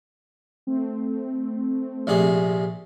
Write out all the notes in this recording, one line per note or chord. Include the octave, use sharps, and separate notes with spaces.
A3 C4
A#1 C3 G#4